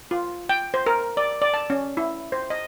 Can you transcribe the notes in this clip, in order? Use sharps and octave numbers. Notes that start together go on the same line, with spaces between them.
F4
G5
C5
A#4
D5
D5
A5
C#4
E4
C5
D#5